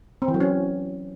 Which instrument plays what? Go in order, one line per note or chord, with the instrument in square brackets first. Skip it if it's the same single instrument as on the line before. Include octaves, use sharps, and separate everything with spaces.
[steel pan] C4
E3
F#3
C#4